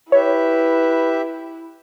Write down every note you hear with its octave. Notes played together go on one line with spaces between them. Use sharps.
E4 G4 B4 C#5 E5